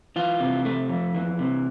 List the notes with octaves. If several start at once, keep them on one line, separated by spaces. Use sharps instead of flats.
E3 F4
C3
A3
F2
E3
C3